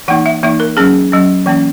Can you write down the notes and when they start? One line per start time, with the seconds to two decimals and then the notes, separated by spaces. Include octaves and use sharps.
0.08 E3 A#3 D#4 F#5
0.26 E5
0.43 E3 A#3 D#4 E5
0.60 A#4
0.77 F#3 C#4 G#4
1.12 F#3 C#4
1.46 E3 A#3 C#4